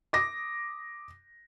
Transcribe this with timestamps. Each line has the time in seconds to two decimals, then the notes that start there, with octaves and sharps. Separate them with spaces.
0.13 D6 D#6 A#6